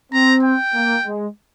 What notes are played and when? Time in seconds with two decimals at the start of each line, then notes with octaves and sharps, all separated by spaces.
0.13 C4 A#5
0.43 G5
0.74 A#3
1.05 G#3